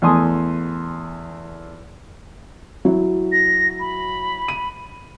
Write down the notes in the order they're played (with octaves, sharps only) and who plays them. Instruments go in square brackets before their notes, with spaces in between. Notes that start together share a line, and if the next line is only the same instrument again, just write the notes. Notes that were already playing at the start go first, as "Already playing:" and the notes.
[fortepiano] E2 A3 G#5 C6 D#6
[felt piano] F#3 E4
[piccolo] A#6
B5
[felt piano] D#7